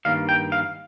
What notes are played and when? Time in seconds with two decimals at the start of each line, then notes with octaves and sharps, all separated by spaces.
0.05 G2 D#3 A#3 F5
0.29 G5
0.52 F5